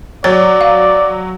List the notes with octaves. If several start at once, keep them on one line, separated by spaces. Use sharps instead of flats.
F#3 C#5 D5 A6
F5